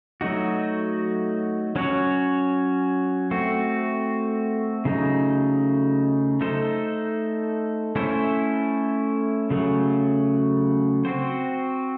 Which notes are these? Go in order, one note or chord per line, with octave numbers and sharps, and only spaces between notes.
F#3 A3 D#4 F#4
F#3 C#4 F#4 C#5
A3 C4 F#4
C#3 F#3 A3 D#4
A3 D#4 A4 C5
A3 C#4 E4 C5
C#3 F#3 A3
C4 F#4 C5